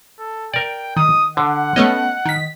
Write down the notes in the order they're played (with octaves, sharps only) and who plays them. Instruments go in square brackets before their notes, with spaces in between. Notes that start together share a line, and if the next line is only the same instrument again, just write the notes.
[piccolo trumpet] A4
[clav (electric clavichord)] A#4 D5 [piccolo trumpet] G5
[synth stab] D#3 [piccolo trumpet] D#6
[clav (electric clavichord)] D3 [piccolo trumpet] F#5
[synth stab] A3 B3 C#4 [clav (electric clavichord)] D#5
[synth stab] D#3 B6